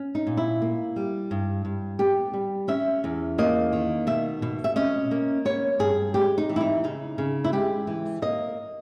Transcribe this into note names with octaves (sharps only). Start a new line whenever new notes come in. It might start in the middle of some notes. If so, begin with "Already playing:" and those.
Already playing: C#4
D#4
A#2
E4
A#3
G3
G2
G2
B3 G4
G3
C#4 E5
E2
A#3 D#5
D#3
B2 E5
B2
E5
C#4 D#5
A#3
B3 C#5
G2 G#4
G#3 G4
D#4
E3
E4
D#4
C#3 D#4
C#3
E4
G#3 G4
E3
A#3 D#5